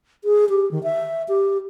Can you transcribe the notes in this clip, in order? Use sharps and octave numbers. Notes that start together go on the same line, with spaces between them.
G#4
G4
D#3
E5
G4